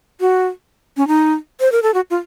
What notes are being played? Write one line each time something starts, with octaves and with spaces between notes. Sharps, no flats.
F#4
C#4
D#4
C5
A#4
A4
F#4
F4